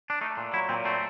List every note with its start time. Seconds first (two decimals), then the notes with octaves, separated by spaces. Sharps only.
0.10 D4
0.21 A3 D#4
0.37 A#2
0.53 F#3 E4
0.69 A#2 C4
0.85 A3 C4